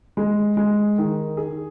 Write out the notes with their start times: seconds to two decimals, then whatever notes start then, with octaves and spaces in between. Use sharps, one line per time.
0.17 G#3
0.57 G#3
0.98 D#3
1.37 G#4